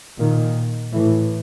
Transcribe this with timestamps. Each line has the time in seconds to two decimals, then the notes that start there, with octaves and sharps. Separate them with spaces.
0.19 A#2 D#3
0.93 A2 E3